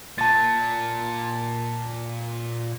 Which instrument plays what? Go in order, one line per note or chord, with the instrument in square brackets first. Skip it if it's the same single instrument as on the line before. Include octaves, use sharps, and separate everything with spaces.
[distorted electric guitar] A#2 [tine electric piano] A5 A6